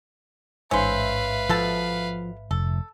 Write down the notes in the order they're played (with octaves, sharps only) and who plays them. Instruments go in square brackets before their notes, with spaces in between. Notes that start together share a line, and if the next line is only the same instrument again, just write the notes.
[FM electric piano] A1 G#2 E5 [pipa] C#4 C5 [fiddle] B4 F5
[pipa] B2 A4 A5 [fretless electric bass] F3
[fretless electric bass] F1 [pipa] A4